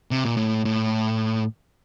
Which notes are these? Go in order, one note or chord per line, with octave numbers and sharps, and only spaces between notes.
C3
A#2
A2
A2